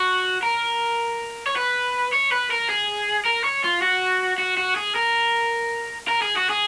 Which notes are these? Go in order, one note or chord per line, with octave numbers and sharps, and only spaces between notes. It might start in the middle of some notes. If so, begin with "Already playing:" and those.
Already playing: F#4
A#4
C#5
B4
C#5
B4
A#4
G#4
A#4
C#5
F4
F#4
F#4
F#4
G#4
A#4
A#4
G#4
F#4
G#4